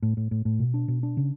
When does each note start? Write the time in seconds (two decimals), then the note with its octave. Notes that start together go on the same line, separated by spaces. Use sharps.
0.02 A2
0.17 A2
0.31 A2
0.45 A2
0.59 B2
0.74 D4
0.88 B2
1.03 D4
1.17 C#3